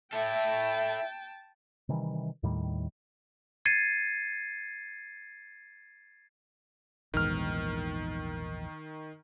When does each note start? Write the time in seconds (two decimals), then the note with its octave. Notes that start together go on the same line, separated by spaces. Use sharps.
0.13 E4 A4 E5 G5 A5
1.89 C3 D#3 E3 G3
2.43 D#2 A2 D#3 G3
3.65 G#6 A6 C7 C#7 D#7
7.14 A#1 E2 G#2 D#3 F6